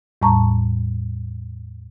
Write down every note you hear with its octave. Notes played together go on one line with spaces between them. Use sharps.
E2 A2 G3 A5 A#5 C#6